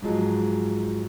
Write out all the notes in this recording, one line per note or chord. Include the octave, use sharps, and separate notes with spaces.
G#2 F3 F#3 G#3